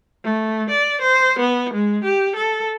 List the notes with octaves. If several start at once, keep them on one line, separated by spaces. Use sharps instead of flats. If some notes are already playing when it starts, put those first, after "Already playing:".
A3
D5
C5
B3
G#3
G4
A4